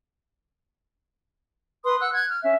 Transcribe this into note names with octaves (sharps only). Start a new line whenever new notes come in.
B4 C6 D#6
F#5 E6 F#6
F#6 G#6
F6
C#4 E5